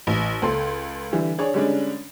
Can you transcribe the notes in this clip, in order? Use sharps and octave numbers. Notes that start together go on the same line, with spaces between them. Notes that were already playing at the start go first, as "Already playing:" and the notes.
A1
C#2 A4 C6
D3 E3 G3
D4 G#4 C#5
D3 G3 G#3 C#4 D4